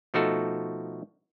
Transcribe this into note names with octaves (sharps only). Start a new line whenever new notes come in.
B2 F3 A3 D#4 F#4 A4